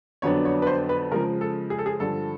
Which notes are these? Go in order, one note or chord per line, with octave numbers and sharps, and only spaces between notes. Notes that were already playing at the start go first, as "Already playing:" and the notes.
F2 D3 F#3 B3 D4 C#5
C#5
B4
C5
B4
C#3 F3 G#3 A#4
A4
G#4
A4
G#4
G2 D3 F3 A4